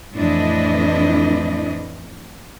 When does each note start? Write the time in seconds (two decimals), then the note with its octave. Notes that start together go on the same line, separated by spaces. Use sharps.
0.15 F2 A2 E3 D4 E4 D#5